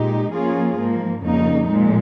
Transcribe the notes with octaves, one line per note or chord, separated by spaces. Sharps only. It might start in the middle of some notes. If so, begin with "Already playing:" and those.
Already playing: A#2 G#3 D#4 G4
F3 A#3 C#4 F4 G#4
G#2 F3 A#3
F2 C#3 G3 A#3 D#4
A#2 F3 G#3